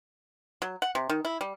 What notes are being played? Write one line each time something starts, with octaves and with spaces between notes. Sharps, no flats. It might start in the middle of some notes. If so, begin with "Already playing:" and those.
F#3
F#5
C3
D#3
E4
G3